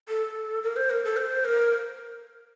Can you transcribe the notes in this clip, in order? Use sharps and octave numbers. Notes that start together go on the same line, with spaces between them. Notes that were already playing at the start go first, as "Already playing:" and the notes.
A4
A#4
C5
A#4
A4
C5
A#4